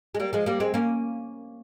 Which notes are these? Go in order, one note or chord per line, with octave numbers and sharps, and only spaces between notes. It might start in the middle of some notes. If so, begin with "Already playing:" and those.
G#3
G3 A#3
F3 G#3
G3 A#3
G#3 C4
A#3 C#4